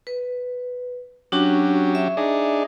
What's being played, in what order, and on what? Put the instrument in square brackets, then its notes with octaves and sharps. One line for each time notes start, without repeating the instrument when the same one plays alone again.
[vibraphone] B4
[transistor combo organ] F#3 C#4 G4 [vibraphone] D4 F#4 C#6
[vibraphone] E5
[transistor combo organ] D4 D#4 G#4